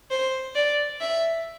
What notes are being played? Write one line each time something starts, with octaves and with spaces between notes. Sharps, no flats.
C5
D5
E5